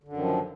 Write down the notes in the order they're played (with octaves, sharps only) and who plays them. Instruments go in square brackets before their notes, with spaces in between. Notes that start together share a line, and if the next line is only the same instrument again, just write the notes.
[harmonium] D3
F#2
D#3
F3